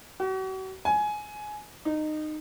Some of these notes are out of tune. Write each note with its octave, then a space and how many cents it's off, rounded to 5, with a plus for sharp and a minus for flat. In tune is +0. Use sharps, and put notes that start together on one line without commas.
F#4 +40
G#5 +15
D#4 -20